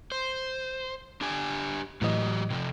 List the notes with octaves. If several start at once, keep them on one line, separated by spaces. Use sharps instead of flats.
C5
D4 G4 G#5
A2 E3 F#3 F#4 G4 D#5
C3 F3